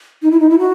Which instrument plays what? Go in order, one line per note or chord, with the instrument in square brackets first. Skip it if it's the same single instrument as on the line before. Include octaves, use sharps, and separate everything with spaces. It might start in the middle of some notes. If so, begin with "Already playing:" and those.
[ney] D#4
E4
D#4
E4
F#4